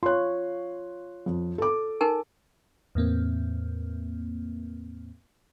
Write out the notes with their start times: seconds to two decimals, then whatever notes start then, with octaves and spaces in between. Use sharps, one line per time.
0.03 F4 C#5 C6 F#6
1.26 F2
1.58 A4 D6
2.01 D#4 A#4 G#5
2.95 E2 A2 A#3 C4